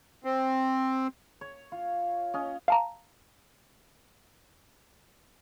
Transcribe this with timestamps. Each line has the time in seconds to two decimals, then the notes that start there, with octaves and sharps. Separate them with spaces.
0.24 C4
1.41 C#5
1.72 F4
2.34 C#4 D#5
2.68 F5 A5 A#5